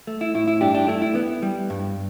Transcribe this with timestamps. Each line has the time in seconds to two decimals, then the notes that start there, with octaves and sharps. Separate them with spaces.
0.07 A3
0.21 E4
0.34 A2 E4
0.48 E4
0.61 G2 D4 G4
0.75 D4 G4
0.88 A3 E4
1.02 E4
1.15 B3
1.43 G3
1.70 G2